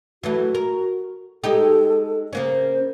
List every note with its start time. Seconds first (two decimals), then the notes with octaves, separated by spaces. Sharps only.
0.23 E3 F#3 A3 F#4
0.55 A#4
1.44 G#3 D#4 G4 A4
2.33 C#3 A#3 C#4 C5